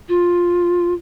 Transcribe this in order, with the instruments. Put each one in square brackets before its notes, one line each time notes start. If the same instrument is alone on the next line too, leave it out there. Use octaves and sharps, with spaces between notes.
[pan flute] F4